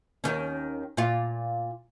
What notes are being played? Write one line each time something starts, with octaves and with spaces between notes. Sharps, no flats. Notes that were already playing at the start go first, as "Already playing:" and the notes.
D#2 D#3 C#4
A#2 F4